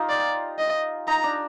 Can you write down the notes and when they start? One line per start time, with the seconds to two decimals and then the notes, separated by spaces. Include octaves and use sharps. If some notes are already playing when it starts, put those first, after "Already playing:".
Already playing: D#4 F4 G4
0.09 D5
0.59 D#5
1.08 D#4 A#5
1.24 D4